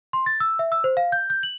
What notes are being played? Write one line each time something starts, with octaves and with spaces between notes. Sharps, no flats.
C6
A6
E6
E5
E6
C5
F5
G6
G6
F#7